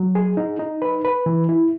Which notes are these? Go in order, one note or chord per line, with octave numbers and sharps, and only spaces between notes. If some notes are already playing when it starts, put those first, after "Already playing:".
Already playing: F#3
G#4
D#4
D#4
B4
B4
E3
E4